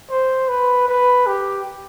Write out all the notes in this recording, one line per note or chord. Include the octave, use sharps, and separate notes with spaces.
C5
B4
B4
G4